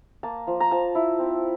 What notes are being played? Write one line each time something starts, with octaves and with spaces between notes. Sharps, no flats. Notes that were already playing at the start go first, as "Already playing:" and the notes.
A#3 A5
F3
A#5
F3 A5
E4
C4